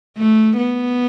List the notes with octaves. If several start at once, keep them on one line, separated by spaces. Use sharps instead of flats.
A3
B3